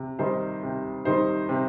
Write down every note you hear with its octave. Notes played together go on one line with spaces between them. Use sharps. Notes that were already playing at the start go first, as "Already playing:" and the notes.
Already playing: C3
D#3 G3 D#4 C5
C3
D#3 G3 D#4 C5
C3